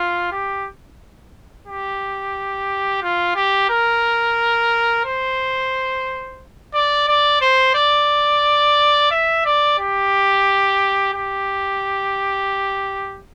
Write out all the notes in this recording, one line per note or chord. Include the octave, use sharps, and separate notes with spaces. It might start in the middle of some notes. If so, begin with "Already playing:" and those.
Already playing: F4
G4
G4
F4
G4
A#4
C5
D5
D5
C5
D5
E5
D5
G4
G4